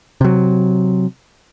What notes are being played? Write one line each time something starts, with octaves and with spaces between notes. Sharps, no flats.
C3 F#3